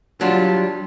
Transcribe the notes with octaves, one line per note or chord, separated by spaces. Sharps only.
F#3 G3 D4 F4